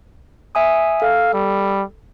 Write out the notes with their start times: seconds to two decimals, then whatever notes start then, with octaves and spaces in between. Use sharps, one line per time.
0.55 E5 G#5 D#6
1.02 A4 F5
1.34 G3